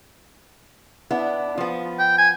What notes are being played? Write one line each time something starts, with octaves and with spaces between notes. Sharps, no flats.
B3 D4 E4
F3 B3
G5
G#5